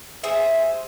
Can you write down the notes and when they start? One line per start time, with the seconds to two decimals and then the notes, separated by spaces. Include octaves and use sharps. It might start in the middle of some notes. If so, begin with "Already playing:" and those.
0.23 G#4 C5 E5